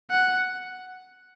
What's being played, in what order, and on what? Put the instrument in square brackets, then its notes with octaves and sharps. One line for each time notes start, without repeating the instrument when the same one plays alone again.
[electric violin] F#5